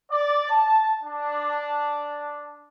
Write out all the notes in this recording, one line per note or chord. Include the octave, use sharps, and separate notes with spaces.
D5
A5
D4